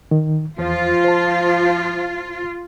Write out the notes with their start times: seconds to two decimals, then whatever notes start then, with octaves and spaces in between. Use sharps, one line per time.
0.11 D#3
0.59 E2 F3 F4
1.04 C5 A5